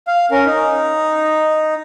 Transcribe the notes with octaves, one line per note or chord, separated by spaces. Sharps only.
F5
C#4 A#4
D#4